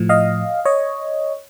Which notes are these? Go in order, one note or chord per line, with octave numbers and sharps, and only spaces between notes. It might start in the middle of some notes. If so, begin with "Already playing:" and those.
Already playing: A2 F3
D#5 F5
C#5 D#5